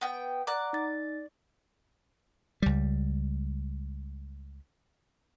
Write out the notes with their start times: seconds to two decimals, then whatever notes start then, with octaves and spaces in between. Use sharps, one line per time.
0.01 B3 G5
0.47 D5 F#5 A#5 D6 F#6
0.73 D#4 A6
2.62 C#2 G3